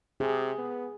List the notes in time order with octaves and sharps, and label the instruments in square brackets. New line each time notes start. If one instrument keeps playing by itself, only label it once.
[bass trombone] C3 [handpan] G#4
[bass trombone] B3